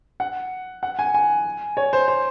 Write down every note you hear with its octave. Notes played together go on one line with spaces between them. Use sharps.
F#5
F#5
G#5
G#5
C#5
C5
C5